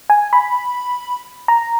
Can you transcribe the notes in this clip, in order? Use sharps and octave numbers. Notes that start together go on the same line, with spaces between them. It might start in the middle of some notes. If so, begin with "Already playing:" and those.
G#5
B5
A#5